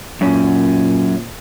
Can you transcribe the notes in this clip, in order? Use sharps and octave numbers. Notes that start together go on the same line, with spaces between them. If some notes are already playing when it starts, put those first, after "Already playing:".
F#2 A#2 C#4